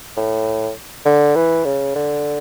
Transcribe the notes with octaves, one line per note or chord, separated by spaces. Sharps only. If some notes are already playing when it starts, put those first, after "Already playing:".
A2
D3
E3
C#3
D3